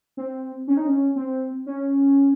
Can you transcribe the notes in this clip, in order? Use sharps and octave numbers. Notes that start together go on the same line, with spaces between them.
C4
C#4
D#4
C#4
C4
C#4